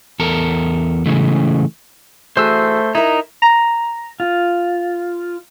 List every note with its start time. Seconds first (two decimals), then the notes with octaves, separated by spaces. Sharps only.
0.20 E2 A4 A#4
1.06 C#3 E3 G#3 A3
2.37 E3 A3 F#4 G#4 C5 E6
2.95 D#4 E4 A#4
3.42 A#5
4.20 F4